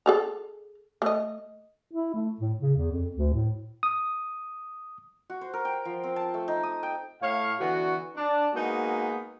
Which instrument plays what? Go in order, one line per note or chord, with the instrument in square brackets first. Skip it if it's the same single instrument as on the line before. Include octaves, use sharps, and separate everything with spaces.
[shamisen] G#4 A4 A#5
A3 D#5
[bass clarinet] E4
A3
A2
C#3
E2
F2
D2
A2
[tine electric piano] D#6
[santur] F#4
C5
A#4
G5
F3
C4
A5
A3
D#4
D#6
G5
[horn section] A2 C#5 F5
D3 E3 B3 F#4
D4
G#3 A#3 B3 D#4 F#4 G#4